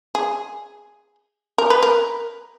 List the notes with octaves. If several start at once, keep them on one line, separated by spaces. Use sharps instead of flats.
G#4
A#4
B4
A#4